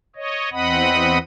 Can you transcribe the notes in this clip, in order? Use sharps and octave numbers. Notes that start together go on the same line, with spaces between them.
C#5 D#5
E2 C4 D#5 F#5 B5 D#6